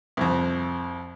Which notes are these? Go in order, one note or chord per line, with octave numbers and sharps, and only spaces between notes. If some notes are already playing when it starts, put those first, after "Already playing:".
C2 F2